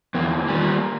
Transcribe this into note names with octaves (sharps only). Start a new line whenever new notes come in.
E2 A#3
D#3 G3